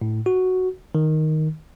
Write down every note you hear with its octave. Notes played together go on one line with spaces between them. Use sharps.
A2
F#4
D#3